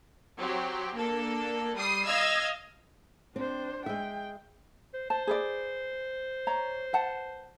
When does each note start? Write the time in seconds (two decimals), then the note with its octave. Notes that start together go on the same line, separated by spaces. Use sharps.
0.38 F#3 C4 G4
0.94 A#3 D4 A4
1.75 G3 D#6 C7
2.07 D#5 F5 E6 F6 G#6
3.36 C4 D4 C5
3.86 G#3 E5 G5
4.94 C5
5.10 C5 A5
5.27 G#4 B4 D5
6.47 C#5 A#5
6.93 B4 F#5 A5